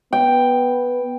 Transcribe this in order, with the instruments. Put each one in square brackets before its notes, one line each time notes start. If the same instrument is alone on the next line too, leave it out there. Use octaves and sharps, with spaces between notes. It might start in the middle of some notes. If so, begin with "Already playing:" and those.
[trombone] B3 [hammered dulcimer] G5